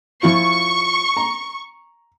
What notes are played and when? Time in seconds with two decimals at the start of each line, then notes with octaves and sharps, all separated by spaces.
0.23 F3 E4 F4 C#6
1.17 A#5